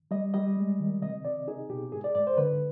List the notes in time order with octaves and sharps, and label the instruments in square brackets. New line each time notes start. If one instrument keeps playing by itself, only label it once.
[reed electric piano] G3 D#5
G3 D#5
G#3
D#3
C3 D#5
C3 D5
D#4 G#4
B2 G4
G#2 G#4
D5
G#2 D5
C5
D3 B4